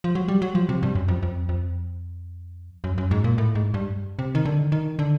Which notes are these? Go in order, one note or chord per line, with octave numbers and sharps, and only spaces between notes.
F3
F#3
G3
F#3
F3
C3
G2
F#2
F2
F2
F2
F#2
F#2
G#2
A#2
A2
G#2
G2
C3
D#3
D3
D#3
D3